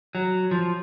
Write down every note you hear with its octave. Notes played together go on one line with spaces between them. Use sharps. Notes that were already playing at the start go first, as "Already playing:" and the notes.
F#3
F3